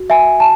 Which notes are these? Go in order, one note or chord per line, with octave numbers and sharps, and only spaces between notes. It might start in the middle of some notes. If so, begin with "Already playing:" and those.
Already playing: F#4
E5 G#5
A5